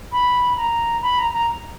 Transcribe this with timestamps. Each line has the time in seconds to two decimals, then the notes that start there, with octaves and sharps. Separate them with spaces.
0.12 B5
0.56 A#5
1.02 B5
1.18 A#5
1.32 A#5